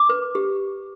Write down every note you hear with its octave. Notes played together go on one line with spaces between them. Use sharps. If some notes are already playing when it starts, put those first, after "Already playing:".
Already playing: D6
B4
G4